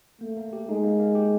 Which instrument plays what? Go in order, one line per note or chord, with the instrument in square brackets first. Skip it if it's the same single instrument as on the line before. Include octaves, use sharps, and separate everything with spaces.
[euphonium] A3 [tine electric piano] A#3
[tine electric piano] A#3
G4
[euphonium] G#3 [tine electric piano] D#4
[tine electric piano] A#3
A#3
G4